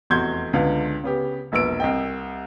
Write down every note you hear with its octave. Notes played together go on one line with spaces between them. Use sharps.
F1 E2 F#4 C6 G6 G#6
C#2 D3 B3 F5
C#3 B3 G4
E1 A#1 B4 E6 D7
C2 D#5 G5